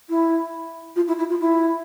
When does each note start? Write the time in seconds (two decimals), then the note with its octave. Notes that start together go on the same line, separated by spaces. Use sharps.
0.09 E4
0.96 F4
1.08 E4
1.19 E4
1.30 F4
1.40 E4